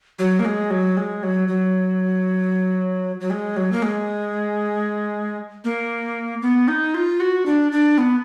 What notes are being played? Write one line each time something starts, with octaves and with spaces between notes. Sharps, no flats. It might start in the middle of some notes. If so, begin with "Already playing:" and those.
F#3
A#3
G#3
F#3
G#3
F#3
F#3
F#3
G#3
F#3
A#3
G#3
A#3
B3
D#4
F4
F#4
D4
D4
B3